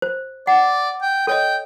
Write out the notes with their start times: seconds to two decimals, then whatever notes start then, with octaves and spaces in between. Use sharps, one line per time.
0.02 C5
0.47 D5 F#5
1.02 G5
1.27 A4 C#5 D#5 G5